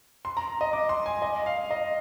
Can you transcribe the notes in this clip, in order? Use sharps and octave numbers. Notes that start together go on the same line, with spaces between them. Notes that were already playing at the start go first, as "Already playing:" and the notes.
C6
A#5
D#5
D6
C6
G#5
D#5
F5
D#5